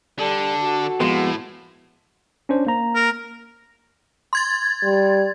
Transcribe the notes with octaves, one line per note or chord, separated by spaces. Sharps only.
D3 G3 A4
F#4
F2 A2 G#3 B3
C#4 D4 C5
A#3 A#5
A#4
C6 G#6 A6
G3